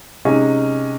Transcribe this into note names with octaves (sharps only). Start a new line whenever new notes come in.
C3 G#3 C#4 D#4